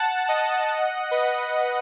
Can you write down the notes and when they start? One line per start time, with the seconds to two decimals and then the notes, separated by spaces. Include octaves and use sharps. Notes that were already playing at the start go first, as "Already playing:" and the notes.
Already playing: F#5 A5
0.29 D#5 F#5
1.11 B4 D#5